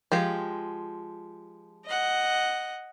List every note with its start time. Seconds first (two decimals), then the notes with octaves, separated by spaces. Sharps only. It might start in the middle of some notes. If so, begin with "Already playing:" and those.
0.12 F3 G#3 G4
1.86 D#5 F#5